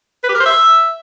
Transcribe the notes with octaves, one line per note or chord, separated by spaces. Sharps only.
B4
G4
A#4
C5
E5